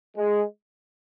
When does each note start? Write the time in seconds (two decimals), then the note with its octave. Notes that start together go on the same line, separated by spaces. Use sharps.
0.17 G#3